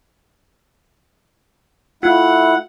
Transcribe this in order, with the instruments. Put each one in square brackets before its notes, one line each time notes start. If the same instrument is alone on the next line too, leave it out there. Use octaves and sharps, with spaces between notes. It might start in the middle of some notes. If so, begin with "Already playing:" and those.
[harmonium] A3 E4 [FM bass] F4 [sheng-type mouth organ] F#5